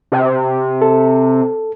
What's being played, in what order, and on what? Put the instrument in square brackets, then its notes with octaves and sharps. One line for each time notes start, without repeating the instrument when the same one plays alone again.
[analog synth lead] C3
[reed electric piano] A4